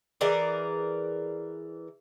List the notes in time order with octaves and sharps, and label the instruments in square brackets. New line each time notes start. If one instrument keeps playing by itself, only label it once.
[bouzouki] E3 G#4 A#4 D5